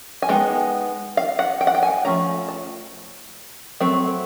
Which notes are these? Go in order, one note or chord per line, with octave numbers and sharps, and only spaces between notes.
G#5
G#3 B3 D#4 G5
F5
F#5
G5
F#5
G5
G#5
F3 A3 C#4 A#5
A5
F#3 A3 C4